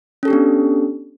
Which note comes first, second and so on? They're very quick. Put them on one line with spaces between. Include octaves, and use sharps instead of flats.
C#4 A4 G4 D4 B3